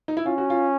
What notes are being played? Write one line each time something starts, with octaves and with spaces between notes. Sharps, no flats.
D#4
E4
C#4 F4
F#4
F4